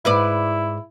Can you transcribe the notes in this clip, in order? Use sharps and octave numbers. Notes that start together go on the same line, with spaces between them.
G#2 E4 B4 D5